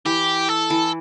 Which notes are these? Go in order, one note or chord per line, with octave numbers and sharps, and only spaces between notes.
E3 G4
A4
E3